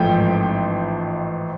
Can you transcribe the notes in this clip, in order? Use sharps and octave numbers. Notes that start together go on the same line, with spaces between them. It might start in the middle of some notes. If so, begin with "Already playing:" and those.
Already playing: A1 G#2 F3 A3 G5